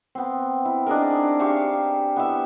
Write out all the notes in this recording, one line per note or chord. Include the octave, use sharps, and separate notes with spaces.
B3 C4
E4
D4 D#4 G#4 A#4
G4 E5 F5 C#6
B3 E4 E5